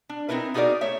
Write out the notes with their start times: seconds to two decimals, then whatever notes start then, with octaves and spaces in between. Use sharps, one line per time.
0.09 D4
0.29 C4 D#4 E4 A#4 B4
0.54 B3 D#4 F#4 G#4 A#4 D5
0.81 A3 C#5 E5